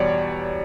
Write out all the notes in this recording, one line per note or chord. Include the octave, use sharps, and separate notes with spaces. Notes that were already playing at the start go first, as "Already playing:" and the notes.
Already playing: E2 B2 G3 C#5 D5